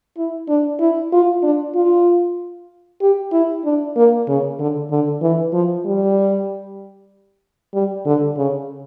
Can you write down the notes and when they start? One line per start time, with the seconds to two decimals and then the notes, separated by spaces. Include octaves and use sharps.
0.18 E4
0.49 D4
0.80 E4
1.12 F4
1.43 D4
1.75 F4
3.02 G4
3.32 E4
3.65 D4
3.97 A#3
4.28 C#3
4.59 D3
4.91 D3
5.22 E3
5.53 F3
5.85 G3
7.74 G3
8.05 D3
8.37 C#3